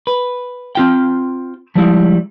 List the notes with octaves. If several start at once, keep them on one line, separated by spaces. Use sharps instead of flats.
B4
C4 F4 G5
F3 G3 G#3 E4